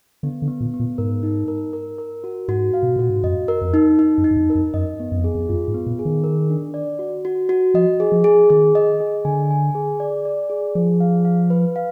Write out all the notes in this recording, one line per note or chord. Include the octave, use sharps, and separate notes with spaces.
D3 B3
D3
B3
A#2
B3
A#2
G#2 A#4
D#4
A#4
A#4
A#4
F#4
G#2 F#4
F5
B2
A#2 F#4
G#2
F#2 D#5
A#4
F2
D#4
D#4
F#2
D#4
F#2
F2
A#4
F2
F#2 D#5
B3
F#2
F2
G#4
F2
F#2 F4
G#2
B3
A#2
G#4
D#3
A#4
D4
D5
F#4
F#4
F#4
F3 D#5
G#4
F3
G#4
D#3 G#4
D#5
G#4
D3 G#5
G#5
G#4
D5
D5
G#4
F3 G#4
F5
F5
B4
F5